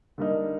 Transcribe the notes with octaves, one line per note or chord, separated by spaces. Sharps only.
D3 G3 A#3 D#4